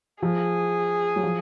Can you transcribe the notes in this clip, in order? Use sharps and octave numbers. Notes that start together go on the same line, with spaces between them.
F3 G#4
F#3
F3